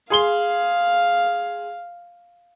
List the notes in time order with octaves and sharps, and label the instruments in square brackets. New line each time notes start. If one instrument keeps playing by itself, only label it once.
[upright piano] G#4 C6 G7 [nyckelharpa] F5